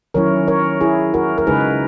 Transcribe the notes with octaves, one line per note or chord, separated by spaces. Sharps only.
D#3 F#3 C#4 E4 A#4 C#5
A#4 C#5
E4 G#4
F#4 A#4
A#4
C#3 G#3 D#4 G#4 B4